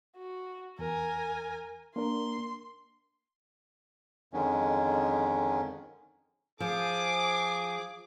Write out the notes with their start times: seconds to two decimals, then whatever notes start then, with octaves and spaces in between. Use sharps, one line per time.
0.17 F#4
0.79 E2 A#4 G#5
1.96 A#3 D4 A#4 C6
4.33 F2 D3 D#3 G#3 C#4
6.60 F3 G#4 D6